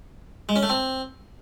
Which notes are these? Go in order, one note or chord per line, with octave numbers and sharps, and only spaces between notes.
G#3
C#4
A3
C4